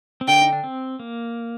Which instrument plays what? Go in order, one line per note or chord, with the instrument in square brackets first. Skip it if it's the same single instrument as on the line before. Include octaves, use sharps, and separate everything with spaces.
[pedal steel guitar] C4
[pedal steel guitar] D3 D4 [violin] G5
[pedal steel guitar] D#4
D4
C4
A#3